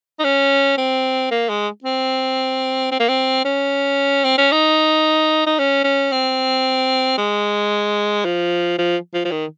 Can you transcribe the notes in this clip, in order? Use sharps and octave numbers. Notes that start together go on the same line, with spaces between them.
D#4
C#4
C4
A#3
G#3
C4
C4
A#3
C4
C#4
C4
C#4
D#4
D#4
C#4
C#4
C4
G#3
F3
F3
F3
F3
D#3